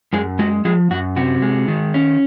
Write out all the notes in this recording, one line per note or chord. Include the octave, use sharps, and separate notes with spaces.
F#2 G#3 G#4
G#3 F#4
F3 G#3 G#4
F#2 F#4
C3 F#4
G#3
D#3
C#4